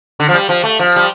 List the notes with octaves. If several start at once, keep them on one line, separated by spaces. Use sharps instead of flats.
D3
F3
G3
F3
A3
F3
G3